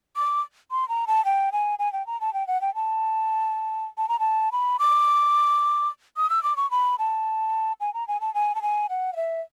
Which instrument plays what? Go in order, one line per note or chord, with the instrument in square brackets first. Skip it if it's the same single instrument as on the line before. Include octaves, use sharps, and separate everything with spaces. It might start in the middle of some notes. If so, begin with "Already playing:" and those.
[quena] D6
C6
A#5
A5
G5
G#5
G#5
G5
A#5
A5
G5
F#5
G5
A5
A5
A#5
A5
B5
D6
D#6
E6
D6
C#6
B5
A5
G#5
A#5
G#5
A5
G#5
A5
G#5
F#5
F5
E5